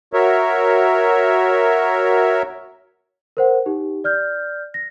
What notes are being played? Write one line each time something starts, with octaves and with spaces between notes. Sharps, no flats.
F#4 A#4 C#5 E5
A#4 C5 F#5
D#4 G4
D5 F6 G6
A#6